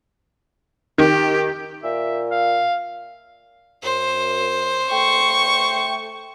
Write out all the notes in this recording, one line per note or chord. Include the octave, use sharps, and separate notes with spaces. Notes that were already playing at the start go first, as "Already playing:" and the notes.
D#3 G4
A#2 E5
F5
F#2 C5
A3 G5 C#6